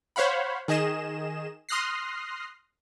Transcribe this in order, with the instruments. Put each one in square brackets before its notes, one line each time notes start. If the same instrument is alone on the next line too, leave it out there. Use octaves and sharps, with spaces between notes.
[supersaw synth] C5 C#5 F5 F#5 B5
D#3 G#4 D#5 E7
C6 D#6 F6 F#6 A#6 C7